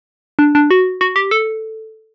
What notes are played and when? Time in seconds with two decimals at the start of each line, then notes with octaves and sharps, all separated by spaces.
0.39 D4
0.55 D4
0.71 F#4
1.01 F#4
1.16 G4
1.31 A4